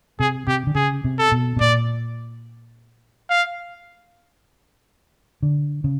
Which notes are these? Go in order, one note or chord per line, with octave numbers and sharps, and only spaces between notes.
C3 G#4
C3 G4
D3
C#3 G#4
C3
A4
B2
B2
A#2 D5
F5
D3
C#3